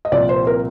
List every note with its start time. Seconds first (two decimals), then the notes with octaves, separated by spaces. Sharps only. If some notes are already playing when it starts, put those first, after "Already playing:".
0.05 D#5
0.12 C2 A#2 F3 D5
0.29 C5
0.47 A#4